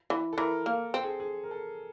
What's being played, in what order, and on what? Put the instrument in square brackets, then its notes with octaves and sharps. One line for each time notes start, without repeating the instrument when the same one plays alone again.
[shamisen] E3
[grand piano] A4
[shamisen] E3 [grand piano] A#4
[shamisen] A#3
[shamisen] C4 [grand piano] A4
[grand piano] G#4
G#4
A#4
A4